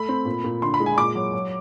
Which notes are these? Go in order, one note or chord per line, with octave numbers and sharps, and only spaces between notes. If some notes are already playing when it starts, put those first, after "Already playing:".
Already playing: A3 B5
C4
A#2
A#2
D3 C6
B5
G#3
G#5
A#2 D6
F#3
F#3